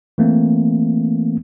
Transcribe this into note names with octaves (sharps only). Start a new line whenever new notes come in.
E3 A3 A#3 C4